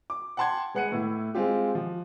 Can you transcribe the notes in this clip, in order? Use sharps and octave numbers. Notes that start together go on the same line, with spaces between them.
D6
F#5 G5 A5 C6 D6 G#6
G#3 B3 F#5 F#6 C#7 D#7
A2 E4
G#3 C4 F4 G4
F3